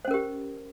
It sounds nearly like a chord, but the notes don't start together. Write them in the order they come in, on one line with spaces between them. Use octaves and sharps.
C5 C#4 A#4 G4